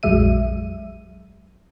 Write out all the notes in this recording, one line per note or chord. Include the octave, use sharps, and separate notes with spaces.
A#1 F2 F#3 G#3 E5 D#7